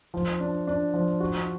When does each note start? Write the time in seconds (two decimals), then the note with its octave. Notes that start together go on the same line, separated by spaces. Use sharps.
0.14 F3
0.40 D4
0.67 D4
0.94 F3
1.20 F#4